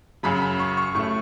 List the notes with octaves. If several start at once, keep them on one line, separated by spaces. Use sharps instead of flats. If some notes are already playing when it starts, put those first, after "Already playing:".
F#2 C#3 F#3 B5
B5
C#6
C#6
A2 A3 C#6